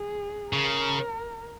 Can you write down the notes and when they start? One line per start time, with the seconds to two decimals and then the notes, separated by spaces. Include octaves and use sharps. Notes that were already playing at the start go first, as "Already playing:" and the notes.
Already playing: G#4
0.53 C#3 A#4